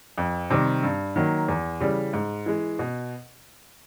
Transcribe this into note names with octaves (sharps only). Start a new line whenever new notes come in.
F2
C3 D#3 G3 C4
G2
D#3 F#3 A#3
E2
C#3 E3 G3
G#2
E3 G#3
B2